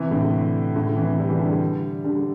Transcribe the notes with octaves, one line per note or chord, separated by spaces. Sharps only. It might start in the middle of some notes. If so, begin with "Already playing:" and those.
Already playing: C3 E3
A2 D3
A2 D3
C3 E3
G3
E3
D3 G3
D3 G3